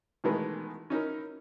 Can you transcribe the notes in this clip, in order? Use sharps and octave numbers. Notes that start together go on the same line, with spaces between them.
B2 D#3 E3 G#3 A3 B3
C#4 D#4 E4 A#4